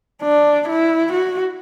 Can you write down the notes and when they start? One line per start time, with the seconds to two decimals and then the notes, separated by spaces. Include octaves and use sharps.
0.23 D4
0.68 E4
1.13 F#4